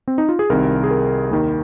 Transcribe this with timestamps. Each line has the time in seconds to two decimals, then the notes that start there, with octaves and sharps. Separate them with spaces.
0.08 C4
0.18 D#4
0.29 F4
0.39 G#4
0.50 C2 C3 D#3 A#4
0.83 G#4
0.91 A#4
1.31 D#2 D#3